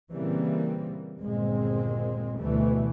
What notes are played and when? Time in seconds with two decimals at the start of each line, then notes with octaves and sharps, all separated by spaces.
0.12 A#2 C#3 E3 G3 A#3 C4
1.20 G1 D#2 A#2 G#3 A#3 C4
2.37 D2 B2 E3 G3 A3